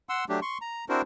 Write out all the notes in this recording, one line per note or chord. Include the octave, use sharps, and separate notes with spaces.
F#5 C6 E6
F#3 A3 D4 G4
C6 C#6
A#5
C4 D4 E4 F#4 A#4 C5